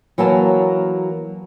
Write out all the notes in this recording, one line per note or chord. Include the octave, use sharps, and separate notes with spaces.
E3 F#3 A#3 A#4 A5